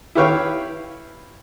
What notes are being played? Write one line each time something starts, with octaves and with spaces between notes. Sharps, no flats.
E4 G4 B4 C#5 F5 G5